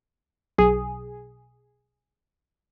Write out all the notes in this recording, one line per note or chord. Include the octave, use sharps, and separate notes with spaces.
B1 G#4